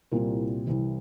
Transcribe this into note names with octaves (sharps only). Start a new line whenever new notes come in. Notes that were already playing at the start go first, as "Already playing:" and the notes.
C2 A#2 G3 C4 E4 A#4
C2 C3 E3